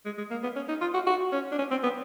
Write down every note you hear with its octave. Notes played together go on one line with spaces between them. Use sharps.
G#3
G#3
A#3
B3
C#4
D#4
F4
F#4
F#4
C#4
D4
C#4
C4
B3